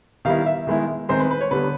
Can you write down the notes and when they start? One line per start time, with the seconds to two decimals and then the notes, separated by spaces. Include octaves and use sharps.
0.25 D#3 G3 B3 E4 F5
0.46 E5
0.67 D#3 G#3 B3 E4
1.09 D#3 G#3 C4 D#4 C5
1.20 B4
1.31 B4
1.41 C#5
1.51 D3 G3 B3 B4